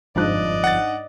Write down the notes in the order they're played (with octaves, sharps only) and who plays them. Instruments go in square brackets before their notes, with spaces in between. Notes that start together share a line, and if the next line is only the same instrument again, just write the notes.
[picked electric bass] G1 F2 F3 [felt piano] G#2 D4 F#6 [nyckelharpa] D5 D#5
[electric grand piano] F#5 A6